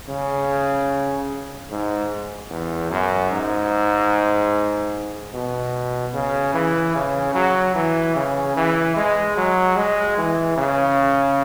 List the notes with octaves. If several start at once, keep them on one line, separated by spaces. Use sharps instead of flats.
C#3
G#2
E2
F#2
G#2
B2
C#3
E3
C#3
F#3
E3
C#3
E3
G#3
F#3
G#3
E3
C#3